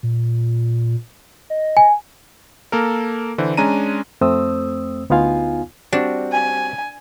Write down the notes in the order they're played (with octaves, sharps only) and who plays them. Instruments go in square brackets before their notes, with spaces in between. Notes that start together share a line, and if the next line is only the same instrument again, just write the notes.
[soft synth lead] A#2
D#5
[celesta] G#5
[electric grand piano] A#3 A4 A#4
D3 E3 C5
G#3 C#4 D4 A#5 D#7
[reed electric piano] F2 A3 C4 C5 D#6 E6
D2 B3 D#4 F4 F5 G#5
[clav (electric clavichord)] G3 C4 F#4 [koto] D4
[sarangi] G#5